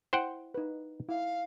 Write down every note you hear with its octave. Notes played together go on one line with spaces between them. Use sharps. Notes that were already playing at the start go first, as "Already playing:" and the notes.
E4 C5 F#5 G5
D#4 B4
E4 F5